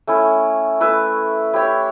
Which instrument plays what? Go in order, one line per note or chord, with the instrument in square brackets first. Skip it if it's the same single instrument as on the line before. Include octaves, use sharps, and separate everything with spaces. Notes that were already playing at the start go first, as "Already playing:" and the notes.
[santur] A3 C#4 E4
A3 E4 B4 E5
E4 G4 C#5 E5